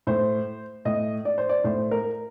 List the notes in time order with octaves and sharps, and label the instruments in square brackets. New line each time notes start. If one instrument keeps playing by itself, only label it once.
[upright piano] A2 C5
A2 D#5
D5
C5
D5
A2 C5
A#4